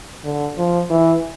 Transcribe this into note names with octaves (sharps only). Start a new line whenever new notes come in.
D3
F3
E3